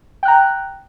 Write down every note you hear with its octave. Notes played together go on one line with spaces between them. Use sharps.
G5 A#5 F#6